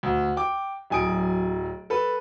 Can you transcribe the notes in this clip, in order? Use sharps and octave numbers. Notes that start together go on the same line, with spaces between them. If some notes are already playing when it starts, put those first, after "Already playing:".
D2
G5 D6
D1 F#2 G#5 D#6 D7
A4 B4